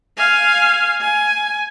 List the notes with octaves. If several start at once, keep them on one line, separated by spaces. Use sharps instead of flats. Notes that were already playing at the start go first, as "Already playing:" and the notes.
F5 G#5
G#5